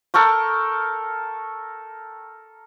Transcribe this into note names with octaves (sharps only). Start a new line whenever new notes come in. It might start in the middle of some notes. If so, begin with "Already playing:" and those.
A4 A#4 G5 C#6